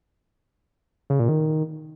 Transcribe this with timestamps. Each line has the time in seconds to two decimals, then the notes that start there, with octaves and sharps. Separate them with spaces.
1.10 C#3
1.19 A#2
1.29 D#3